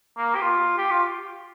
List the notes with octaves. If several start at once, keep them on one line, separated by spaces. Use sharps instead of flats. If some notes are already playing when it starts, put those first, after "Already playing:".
A#3
G4
F4
G4
F4